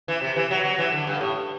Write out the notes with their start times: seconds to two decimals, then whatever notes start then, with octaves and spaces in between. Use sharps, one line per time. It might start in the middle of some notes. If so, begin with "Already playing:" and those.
0.08 E3
0.21 C3
0.36 E3
0.51 F#3
0.64 F#3
0.78 E3
0.92 D3
1.07 G2
1.21 A2